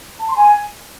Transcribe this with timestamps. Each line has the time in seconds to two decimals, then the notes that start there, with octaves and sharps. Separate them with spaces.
0.20 A5
0.28 C6
0.36 G#5